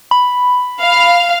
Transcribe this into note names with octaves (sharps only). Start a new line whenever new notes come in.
B5
F5